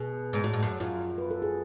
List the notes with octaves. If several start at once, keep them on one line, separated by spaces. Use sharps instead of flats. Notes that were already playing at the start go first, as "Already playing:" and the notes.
Already playing: B2 G#4
G#2
A2 F#4
G#2
F#2
F#2 F4
B4
A4
G#4